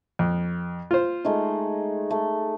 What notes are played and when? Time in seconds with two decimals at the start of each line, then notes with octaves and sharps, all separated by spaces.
0.19 F2
0.91 F4 C5
1.25 G#3 A3 D#4
2.11 A3